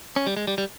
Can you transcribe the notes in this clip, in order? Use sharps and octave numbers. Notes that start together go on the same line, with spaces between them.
C#4
G3
G#3
G3
G3